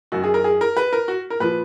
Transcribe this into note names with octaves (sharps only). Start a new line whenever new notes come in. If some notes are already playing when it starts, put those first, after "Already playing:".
F#2 D#3 F#4
G#4
A#4
G#4
A#4
B4
A#4
F#4
A#4
A#2 F3 B4